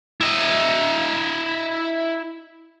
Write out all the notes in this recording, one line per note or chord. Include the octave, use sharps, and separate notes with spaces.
E4 D#5